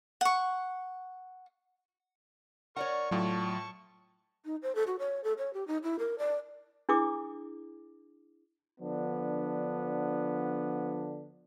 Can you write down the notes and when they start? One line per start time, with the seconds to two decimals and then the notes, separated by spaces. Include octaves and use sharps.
0.21 F#5 C#6
2.76 A#4 C#5 D5 F#5 C#6
3.11 A2 F#3 F4 A5 C#6
4.45 D#4
4.62 C5
4.75 A4
4.87 F#4
4.99 C#5
5.24 A4
5.38 C#5
5.54 G4
5.67 D#4
5.83 E4
5.99 A#4
6.18 D5
6.89 D4 E4 G#4 D6 D#6
8.80 D3 F3 B3 D4